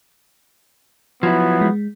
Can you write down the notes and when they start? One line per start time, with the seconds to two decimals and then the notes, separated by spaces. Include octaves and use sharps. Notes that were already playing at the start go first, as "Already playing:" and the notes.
1.23 F3 F#3 B3 E4 G#6
1.61 G#3